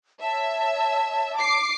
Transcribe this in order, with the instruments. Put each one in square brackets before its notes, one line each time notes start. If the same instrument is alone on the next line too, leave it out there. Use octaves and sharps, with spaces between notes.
[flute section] C#5 A5 [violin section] E5
[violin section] D6 C7